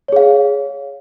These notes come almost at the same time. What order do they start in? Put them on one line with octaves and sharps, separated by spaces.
C#5 G#4 F5